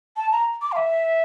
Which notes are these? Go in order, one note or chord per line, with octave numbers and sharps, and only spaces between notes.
A5
A#5
D6
F5
E5